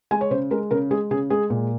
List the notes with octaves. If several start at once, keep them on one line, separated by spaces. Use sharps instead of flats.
G#3 G#5
C#5
C#3 C5
G#3 A#4
C#3 A#4
G#3 G#4
C#3 G#4
G#3 G#4
A#2